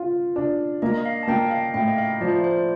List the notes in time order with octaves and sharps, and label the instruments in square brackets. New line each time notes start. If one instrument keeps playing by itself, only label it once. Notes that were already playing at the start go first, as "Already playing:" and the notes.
Already playing: [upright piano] F4
D4
[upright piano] A#3 [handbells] D#5
[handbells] D#5
F5
A5
[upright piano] A#3 [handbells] G5
[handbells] D#5
F5
[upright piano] A2 [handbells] G5
[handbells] D#5
F5
[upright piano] F3 [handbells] D5
[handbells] C5
D5
C5